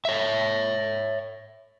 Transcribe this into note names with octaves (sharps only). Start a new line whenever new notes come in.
C#5 E5